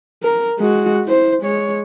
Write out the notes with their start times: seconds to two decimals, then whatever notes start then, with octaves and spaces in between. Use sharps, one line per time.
0.23 A#4
0.59 G#3 F#4
1.05 E4 C5
1.42 G#3 C#5